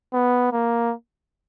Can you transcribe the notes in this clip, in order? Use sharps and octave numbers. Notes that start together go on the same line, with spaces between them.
B3
A#3